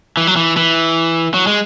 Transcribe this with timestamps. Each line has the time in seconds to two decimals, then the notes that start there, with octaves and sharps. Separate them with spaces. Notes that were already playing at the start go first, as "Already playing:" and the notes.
0.17 E3
0.27 F#3
0.36 E3
0.57 E3
1.34 F#3
1.47 G#3